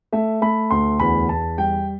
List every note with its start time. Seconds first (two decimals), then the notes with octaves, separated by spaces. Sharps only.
0.13 A3 E5
0.42 A3 B5
0.71 D2 C6
1.00 E2 B5
1.29 E2 A5
1.58 G3 G5